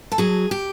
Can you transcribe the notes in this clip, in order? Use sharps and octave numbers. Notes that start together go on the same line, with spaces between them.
A4
F#3 G#4
G4